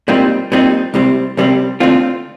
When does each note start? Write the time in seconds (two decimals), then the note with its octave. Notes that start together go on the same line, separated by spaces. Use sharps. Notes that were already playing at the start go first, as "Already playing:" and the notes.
0.08 A#2 G3 C4 D#4
0.52 A#2 G3 C4 D#4
0.94 C2 C3 G3 C4
1.37 C2 C3 G3 C4
1.80 D3 A3 C4 F4